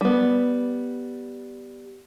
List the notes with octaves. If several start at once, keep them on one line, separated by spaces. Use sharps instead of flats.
G3 B3